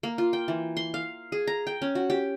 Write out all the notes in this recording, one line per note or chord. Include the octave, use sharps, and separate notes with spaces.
A#3
F4
G5
E3
C6
F5
G#4
A#5
G5
C#4
F#4
G4